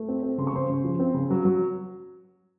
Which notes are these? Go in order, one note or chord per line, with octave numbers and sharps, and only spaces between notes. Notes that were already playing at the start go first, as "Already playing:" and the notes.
Already playing: A3
C4
C4
C#3 C6
C#6
C#3 C5 C6
C#3
F3
C4
C#3
F#3
F#3